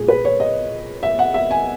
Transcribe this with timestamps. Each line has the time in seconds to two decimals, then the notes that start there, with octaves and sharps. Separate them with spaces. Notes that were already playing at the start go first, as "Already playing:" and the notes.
Already playing: A#2 G#3 G#4
0.08 B4
0.25 C#5
0.40 D#5
1.03 E5
1.19 F#5
1.34 E5
1.51 G#5